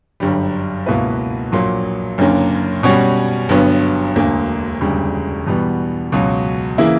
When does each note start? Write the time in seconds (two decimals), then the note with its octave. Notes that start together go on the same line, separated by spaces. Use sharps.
0.20 G1 F#2 D3 G3
0.86 C#2 B2 A#3 E4 B4
1.52 A#1 A#2 F#3 A#3
2.18 F#1 F#2 D3 A#3 C#4
2.83 B2 G3 C#4 F#4 C#5
3.49 G1 G2 F#3 B3
4.15 E1 D2 D3 A#3
4.81 E1 D2 C#3 G3
5.46 E2 B2 G3 B3
6.12 C#2 B2 F#3 C#4
6.78 C#3 E3 A#3 E4